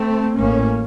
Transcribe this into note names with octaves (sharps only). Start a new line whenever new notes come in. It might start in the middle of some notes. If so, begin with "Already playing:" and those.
Already playing: A3 C4
A1 A2 A#3 C#4